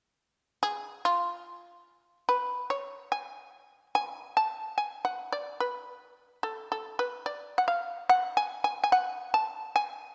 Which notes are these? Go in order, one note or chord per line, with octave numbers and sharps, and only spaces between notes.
G#4
F4
B4
C#5
G#5
G#5
A5
G#5
F#5
D5
B4
A4
A4
B4
D5
F#5
F5
F#5
G#5
G#5
G#5
F#5
A5
G#5